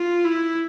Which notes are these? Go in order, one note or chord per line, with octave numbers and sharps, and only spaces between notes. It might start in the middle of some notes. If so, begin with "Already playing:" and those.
Already playing: F4
E4